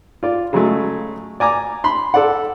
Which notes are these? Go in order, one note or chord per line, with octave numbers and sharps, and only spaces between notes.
F4 D5
C#3 F#3 G#3 A3
D5 G#5 A#5 D6
B5 C6
A4 D5 F#5